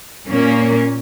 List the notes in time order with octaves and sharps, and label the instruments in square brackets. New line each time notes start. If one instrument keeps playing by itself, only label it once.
[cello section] A#2 A#3 C#4